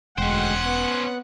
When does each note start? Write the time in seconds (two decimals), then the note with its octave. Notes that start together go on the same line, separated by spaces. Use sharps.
0.18 E1 D2 G#3 C#4 C5 F#5 G5
0.63 B3